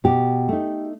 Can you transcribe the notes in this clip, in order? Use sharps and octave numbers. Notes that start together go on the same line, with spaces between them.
B2 G4
A3 D#4